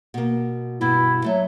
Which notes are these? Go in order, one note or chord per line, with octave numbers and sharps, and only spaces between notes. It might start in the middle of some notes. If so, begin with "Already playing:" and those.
B2 A#3
G2 B2 E4
F#3 A3 E5